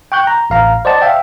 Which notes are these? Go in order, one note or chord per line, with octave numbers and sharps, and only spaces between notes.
G5 C#6 F#6 G6
A#5
A1 F5 A#5
C5 D5 D#5 F#5 A5
E5 F5 G5